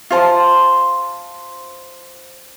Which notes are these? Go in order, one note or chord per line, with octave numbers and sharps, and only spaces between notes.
F4 C5 A5